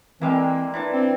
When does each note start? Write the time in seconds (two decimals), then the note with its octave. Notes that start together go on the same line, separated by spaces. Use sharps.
0.22 E3 G3 G#3 A#3 C4
0.74 E3 D4 A5
0.93 C4